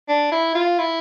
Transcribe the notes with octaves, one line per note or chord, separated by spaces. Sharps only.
D4
E4
F4
E4